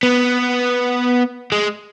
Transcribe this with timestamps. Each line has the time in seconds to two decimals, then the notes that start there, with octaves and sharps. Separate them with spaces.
0.03 B3
1.52 G#3